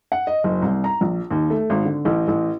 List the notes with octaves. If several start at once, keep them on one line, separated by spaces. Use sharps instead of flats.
F#5
D#5
F#1
C2
A#5
A#1
D#2
A3
G#1
D3
A1
A1